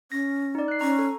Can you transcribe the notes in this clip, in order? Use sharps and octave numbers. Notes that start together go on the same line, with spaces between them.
C#4 A#6
D#4 D5
F#6 C7
C#4 A#5 C#6
A4